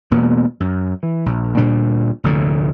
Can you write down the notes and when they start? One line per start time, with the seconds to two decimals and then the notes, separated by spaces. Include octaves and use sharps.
0.11 E1 B2 A#3 B3
0.60 F#2
1.03 E3
1.26 A#1
1.57 D2 A#2 G3 D4
2.24 F1 D2 A2 D3